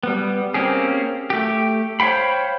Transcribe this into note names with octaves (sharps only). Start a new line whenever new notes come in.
G3 B3
A#3 C4 C#4 G4 G#4
A3 G4
C5 C#5 F5 G5 B5